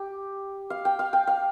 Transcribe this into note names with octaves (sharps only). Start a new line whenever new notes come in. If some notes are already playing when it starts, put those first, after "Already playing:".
Already playing: G4
F5
G5
F5
G5
F5